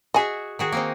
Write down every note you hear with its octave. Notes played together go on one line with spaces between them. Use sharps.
F#4 G#4 D#5 E5 G#5
D#3 F#4 G#4
A#3 C4 D#4